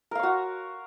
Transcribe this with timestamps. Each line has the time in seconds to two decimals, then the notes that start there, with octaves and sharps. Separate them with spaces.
0.11 A#4
0.15 F5
0.19 C#5
0.23 F#4